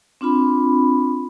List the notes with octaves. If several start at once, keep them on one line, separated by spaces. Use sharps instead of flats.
C4 D4 F4 B5